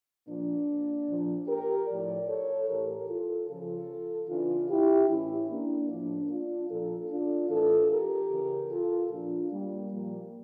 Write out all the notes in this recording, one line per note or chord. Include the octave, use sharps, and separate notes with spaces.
A#2 F3 A#3 D4
A#2 F3
G4 A#4
A2 F3 A#4 D5
A4 C#5
A2 E3 G4 A#4
F4 A4
C#3 F3 F4 A4
C#3 E3 D4 F4
E4 G4
A2 E3 C#4 E4
A#3 D4
A2 F3 A#3 D4
D4 F4
A#2 F3 F4 A4
D4 F4
A2 E3 F4 A4
G4 A#4
C#3 E3
F4 A4
A#2 F3 D4 F4
G3 A#3
A#2 F3 G3 A#3